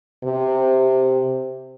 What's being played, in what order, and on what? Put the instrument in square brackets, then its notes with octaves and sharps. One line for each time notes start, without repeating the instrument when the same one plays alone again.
[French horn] C3